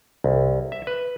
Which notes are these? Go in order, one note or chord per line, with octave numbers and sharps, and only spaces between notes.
C2
E5
B4